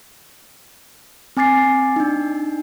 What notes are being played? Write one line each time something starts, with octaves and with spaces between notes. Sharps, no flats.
C4 G#5 D6 A6 C7
D4 D#4